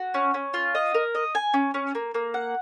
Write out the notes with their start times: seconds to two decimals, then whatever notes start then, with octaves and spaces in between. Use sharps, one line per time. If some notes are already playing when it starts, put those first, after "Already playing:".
Already playing: F#4
0.14 C#4
0.34 C#4
0.54 F4
0.75 D#5
0.94 A#4
1.15 D#5
1.35 G#5
1.54 C#4
1.74 C#4
1.95 A#3
2.14 A#3
2.34 F#5